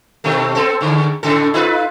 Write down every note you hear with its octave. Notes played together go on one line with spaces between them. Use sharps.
B2 D#3 A3
B3 C4 A4
E2 D3
A2 C#3 A4
D#4 F4 B4